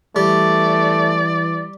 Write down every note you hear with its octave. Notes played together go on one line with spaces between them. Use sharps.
E3 G3 A3 D5